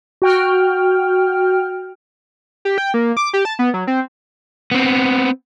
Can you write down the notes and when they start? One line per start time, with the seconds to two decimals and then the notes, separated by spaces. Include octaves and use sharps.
0.22 F#4 G5 F6
2.65 G4
2.78 G5
2.94 A#3
3.17 D6
3.33 G4
3.45 A5
3.59 B3
3.74 F#3
3.87 C4
4.71 B3 C4